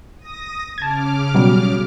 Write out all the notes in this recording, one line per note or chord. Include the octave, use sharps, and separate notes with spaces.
D#6 A#6
C#3 A5 D6 F6 G#6
B2 F#3 G3